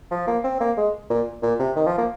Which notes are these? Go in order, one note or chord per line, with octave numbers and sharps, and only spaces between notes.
F3
A#3
C4
A#3
G#3
A#2
A#2
C3
D#3
F3
A#3